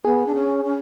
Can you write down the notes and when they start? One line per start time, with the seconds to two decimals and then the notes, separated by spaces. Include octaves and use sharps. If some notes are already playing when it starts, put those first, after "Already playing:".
0.04 B3 G#4
0.26 D4
0.35 C#4
0.64 C#4